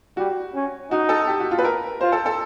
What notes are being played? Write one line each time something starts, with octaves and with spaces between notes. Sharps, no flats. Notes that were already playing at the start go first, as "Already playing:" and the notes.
G3 F#4
C#4
D#4 F#4
A4
G4
F#4
F4
B4
A#4
F4 C5
A4
A4